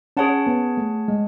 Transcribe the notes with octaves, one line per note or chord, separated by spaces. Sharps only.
C#4 G#4 C#5 F#5 A5
B3
A3
G#3